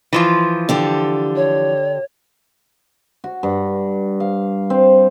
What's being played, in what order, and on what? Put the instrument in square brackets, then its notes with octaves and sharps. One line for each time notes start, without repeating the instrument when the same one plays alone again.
[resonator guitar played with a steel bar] E3 F3 F4
[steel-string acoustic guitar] D3 G4 A4
[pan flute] C#5
[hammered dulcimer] F#4
G2
F5
C4